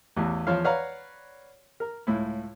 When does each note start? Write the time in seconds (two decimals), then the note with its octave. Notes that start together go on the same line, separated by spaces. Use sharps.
0.16 A1 E2 E3
0.47 E2 F3 C#5 F5
0.64 B4 C#5 D5 F5 F#5 A#5
1.80 A#4
2.07 C#2 A2 E4